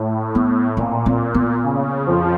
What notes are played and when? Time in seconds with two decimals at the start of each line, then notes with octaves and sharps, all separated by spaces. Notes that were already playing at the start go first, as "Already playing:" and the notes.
Already playing: A2
0.35 B3
0.77 A#2 C4
1.06 C4
1.34 B3
1.64 C#3
2.06 F2 F3